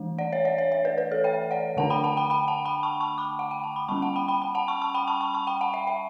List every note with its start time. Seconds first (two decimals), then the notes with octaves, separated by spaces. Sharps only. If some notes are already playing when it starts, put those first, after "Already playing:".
Already playing: E3 A3 D4
0.18 D5 F#5
0.32 C#5 E5
0.45 D5 F#5
0.58 C#5 E5
0.72 C#5 E5
0.85 B4 D5
0.98 B4 D5
1.11 A4 C#5
1.24 E5 G5
1.51 D5 F#5
1.77 D3 A3 D4 F#5 A5
1.90 G5 B5
2.04 F#5 A5
2.17 G5 B5
2.30 G5 B5
2.48 F#5 A5
2.65 G5 B5
2.83 A5 C#6
3.00 A5 C#6
3.18 B5 D6
3.39 F#5
3.51 G5
3.64 A5
3.76 B5
3.88 G3 C#4 A5 C#6
4.02 F#5 A5
4.16 G5 B5
4.28 G5 B5
4.41 G5 B5
4.55 F#5 A5
4.68 A5 C#6
4.82 A5 C#6
4.94 G5 B5
5.07 A5 C#6
5.21 A5 C#6
5.34 A5 C#6
5.47 G5 B5
5.61 F#5 A5
5.74 E5 G5
5.87 E5 G5